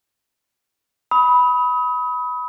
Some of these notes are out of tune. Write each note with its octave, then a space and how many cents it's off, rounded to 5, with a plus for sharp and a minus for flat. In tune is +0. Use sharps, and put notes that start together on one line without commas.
B5 +0 D#6 +35